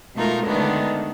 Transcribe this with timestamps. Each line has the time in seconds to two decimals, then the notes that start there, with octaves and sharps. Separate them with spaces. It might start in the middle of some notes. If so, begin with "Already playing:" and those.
0.15 B2 G#3 A3 D#4 F4 A#4
0.47 D3 D#3 G#3 A3 B3 D4